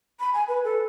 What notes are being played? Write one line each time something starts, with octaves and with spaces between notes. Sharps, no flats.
B5
G#5
B4
A4